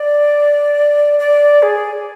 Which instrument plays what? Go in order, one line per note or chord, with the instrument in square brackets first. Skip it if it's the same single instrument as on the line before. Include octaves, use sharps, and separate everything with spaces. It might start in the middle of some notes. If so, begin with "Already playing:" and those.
Already playing: [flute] D5
D5
G#4